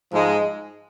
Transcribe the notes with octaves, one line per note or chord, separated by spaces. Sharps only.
G#2 F3 G#3